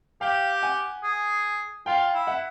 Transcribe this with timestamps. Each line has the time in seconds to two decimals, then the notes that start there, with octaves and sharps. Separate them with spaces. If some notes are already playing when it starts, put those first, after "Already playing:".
0.21 G4 F5 G5
0.63 F#5 G#5
1.03 G#4
1.86 F4 F5 G5
2.14 E4
2.27 E5 F#5